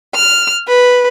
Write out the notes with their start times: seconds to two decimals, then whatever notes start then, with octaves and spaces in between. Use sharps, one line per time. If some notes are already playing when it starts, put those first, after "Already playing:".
0.15 F6
0.68 B4